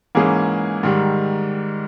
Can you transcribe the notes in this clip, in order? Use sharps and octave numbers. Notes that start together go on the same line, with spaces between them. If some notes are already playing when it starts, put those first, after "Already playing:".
G#2 E3 A#3 C#4 G#4
G#2 D#3 G3